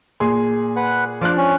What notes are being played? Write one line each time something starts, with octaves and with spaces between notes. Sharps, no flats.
A#2 G#4 C6
B4 F#5
F3 D4 F4 D6 F#6
C#4